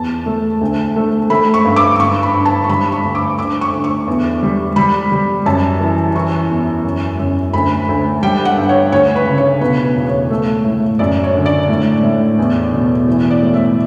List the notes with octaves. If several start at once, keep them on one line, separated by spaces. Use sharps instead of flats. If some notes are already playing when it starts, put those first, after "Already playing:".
Already playing: E2 A5
A3
D2
A3
A3 B5
C#6
G2
D6
D6
G2 C#6
B5
G2
A5
C#6
G3 B5
C#6
D2
D6
D2 D6
C#6
D2
C#6
E2
G3
G3 B5
G3
F#2 A5
E3
E3 C#6
E2
F#2
F#2
D2 B5
D2
G3 G5
F#5
G2
C#5
D2 C#5
B4
C#3
C#5
B2 B4
B4
E2
C#5
A3
A2
F#2 D5
C#5
D3
D5
A2
A2
E2
B2
E3
D5
A2
E5